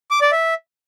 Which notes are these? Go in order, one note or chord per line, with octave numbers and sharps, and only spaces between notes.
D6
D5
E5